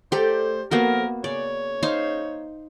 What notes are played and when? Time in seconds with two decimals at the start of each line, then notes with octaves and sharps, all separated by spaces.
0.12 A3 G4 A4 A#4 C5 D5
0.71 F3 A#3 B3 F#4 A4 A#4
1.24 C#3 C#5 D5
1.83 D#4 C5 F5